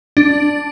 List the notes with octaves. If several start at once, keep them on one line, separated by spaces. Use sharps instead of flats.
D4